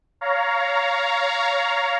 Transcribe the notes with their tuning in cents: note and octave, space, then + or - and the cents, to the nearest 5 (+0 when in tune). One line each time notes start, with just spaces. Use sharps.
C#5 +20 F5 +0 A#5 +0